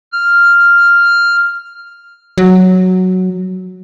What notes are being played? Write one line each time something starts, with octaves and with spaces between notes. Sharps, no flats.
F6
F#3